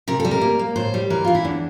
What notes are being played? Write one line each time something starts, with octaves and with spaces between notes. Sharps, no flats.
C3 A#4
G3 A4
A#4
A#3
A#3
A2 C5
G3
E3 A#4
E3 F4
E4
E2 D4